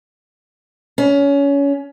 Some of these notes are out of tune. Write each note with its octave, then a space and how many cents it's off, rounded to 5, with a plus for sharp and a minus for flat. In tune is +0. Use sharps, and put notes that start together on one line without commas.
C#4 +25